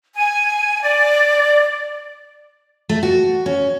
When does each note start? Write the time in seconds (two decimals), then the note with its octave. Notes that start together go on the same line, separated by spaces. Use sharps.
0.15 G#5
0.82 D5
2.89 A3
3.03 F#4
3.46 C#4